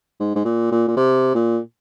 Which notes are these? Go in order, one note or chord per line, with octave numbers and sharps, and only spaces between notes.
G#2
G#2
A#2
A#2
A#2
C3
A#2